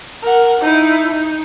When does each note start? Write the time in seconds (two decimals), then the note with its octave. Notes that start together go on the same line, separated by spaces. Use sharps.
0.23 A#4 F#5
0.61 D#4 E4
1.11 D#4